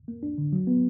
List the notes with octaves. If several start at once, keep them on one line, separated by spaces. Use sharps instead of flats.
A#3
D4
D3
F#3
B3